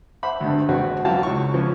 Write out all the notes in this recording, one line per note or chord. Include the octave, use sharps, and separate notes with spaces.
C5 E5 F#5 B5
D2 G2
G#1 D#2 C4 F#4 B4
F#2 E3 F#4 F5 G5 A5
C#2 C#6
E3 F3 C#4